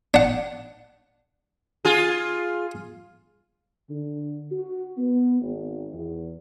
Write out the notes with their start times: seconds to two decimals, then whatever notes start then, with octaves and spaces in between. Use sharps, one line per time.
0.14 D4 F#5
1.85 F4 G#4
3.89 D3
4.52 F#4
4.97 B3
5.42 G#1
5.94 E2